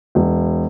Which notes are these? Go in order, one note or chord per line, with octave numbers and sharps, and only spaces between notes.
E1